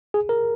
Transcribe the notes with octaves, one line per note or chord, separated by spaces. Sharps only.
G#4
A#4